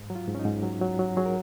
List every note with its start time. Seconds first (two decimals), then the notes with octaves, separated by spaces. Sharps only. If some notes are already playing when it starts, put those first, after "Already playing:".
Already playing: G#2
0.10 F#3
0.16 F4
0.28 G#2
0.35 C#4
0.39 D#4
0.45 G#2
0.63 F#3
0.81 F#3
0.99 F#3
1.08 F#4
1.17 F#3 G#4
1.26 A#4